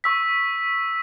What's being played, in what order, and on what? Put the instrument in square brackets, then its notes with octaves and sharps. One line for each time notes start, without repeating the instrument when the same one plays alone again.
[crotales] C#6 E6 B6